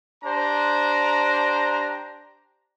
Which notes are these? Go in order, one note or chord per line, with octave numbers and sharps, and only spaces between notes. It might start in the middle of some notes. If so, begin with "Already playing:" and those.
D4 G4 C5 A#5